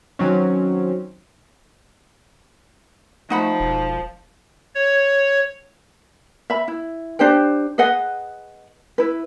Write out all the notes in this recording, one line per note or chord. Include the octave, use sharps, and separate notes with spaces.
D#3 F#3 C4 C#4
F3 A3 D#4 F#5 B5
E1
C#5
E5 B5
E4
D4 G4 C5 G5
G#4 B4 D#5 F#5
E4 B4